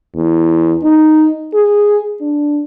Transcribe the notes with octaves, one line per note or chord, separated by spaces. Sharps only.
E2
D#4
G#4
D4